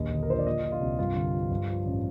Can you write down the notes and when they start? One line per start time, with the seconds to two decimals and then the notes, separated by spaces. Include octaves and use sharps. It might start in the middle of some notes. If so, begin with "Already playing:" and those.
Already playing: A#1 D#2 D#5
0.11 D3
0.23 A#4
0.29 F3 C5
0.39 D5
0.46 A#2 D#5
0.63 F3
0.72 F4
0.81 C2
0.99 G2 F4
1.16 D3
1.33 F3
1.50 G2
1.68 F3
1.85 A1